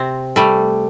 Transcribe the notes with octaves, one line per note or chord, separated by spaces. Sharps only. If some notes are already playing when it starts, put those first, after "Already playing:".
Already playing: C3 C4
G3 A3